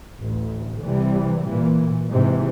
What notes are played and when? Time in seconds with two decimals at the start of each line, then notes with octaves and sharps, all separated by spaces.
0.19 A1 D2
0.80 C2 C3 E3 G3
1.44 A#2 E3
2.10 G#2 C3 E3